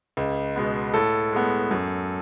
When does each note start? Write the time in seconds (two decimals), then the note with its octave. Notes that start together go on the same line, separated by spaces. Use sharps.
0.17 C#2
0.56 B2 G#3 B3
0.94 A2 A4
1.33 G#3 B3
1.71 F#2